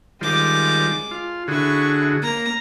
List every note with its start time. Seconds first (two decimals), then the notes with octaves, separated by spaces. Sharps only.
0.21 D#3 G3 G#3 F4 D6
1.11 F4
1.48 D3 E4 F#4 G#4 C#6
2.23 A#3 A#5